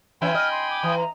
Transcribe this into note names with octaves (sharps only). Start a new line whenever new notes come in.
E3 C#4 E5 G5 G#5 B5
D#5 F6
C6
D6
E3 D#6
A#5